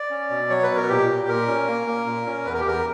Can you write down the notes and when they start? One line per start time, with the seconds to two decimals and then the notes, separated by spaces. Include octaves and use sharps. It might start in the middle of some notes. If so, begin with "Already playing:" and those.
Already playing: D5
0.11 C#4
0.30 B2
0.50 F#3 C#5
0.63 B4
0.69 B2
0.76 A#4
0.89 A#2 G4
1.09 A#2
1.28 A#2 A#4
1.48 C#4
1.67 A#3
1.87 A#3
2.06 A#2
2.26 C#4
2.45 E2 B4
2.54 A#4
2.60 G4
2.65 E2 A#4